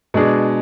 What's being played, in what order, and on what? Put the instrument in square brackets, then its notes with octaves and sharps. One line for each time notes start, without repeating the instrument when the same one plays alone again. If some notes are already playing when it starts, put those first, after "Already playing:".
[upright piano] B2 G#3 D4 G#4